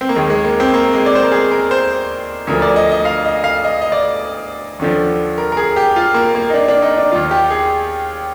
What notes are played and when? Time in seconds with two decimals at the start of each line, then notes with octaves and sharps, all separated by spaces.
0.01 C4
0.09 A#3
0.16 D#2 D#3 G#3
0.30 G#3
0.45 A#3
0.60 C4
0.74 A#3
0.93 G#3
1.06 D5
1.15 C5
1.23 A#4
1.32 G#4
1.52 A#4
1.71 C5
2.47 D2 D3 F3 A#4
2.62 D5
2.76 D#5
2.91 D#5
3.05 F5
3.25 D#5
3.44 F5
3.64 D#5
3.82 D#5
3.92 D5
4.79 D#2 D3 F3
5.38 A#4
5.52 A#4
5.57 G#4
5.76 G4
5.96 F4
6.14 A#3
6.35 A#3
6.50 D#4
6.54 D4
6.68 D4
6.82 D#4
6.98 D4
7.12 D#2 D#3 F4
7.31 G4
7.50 G#4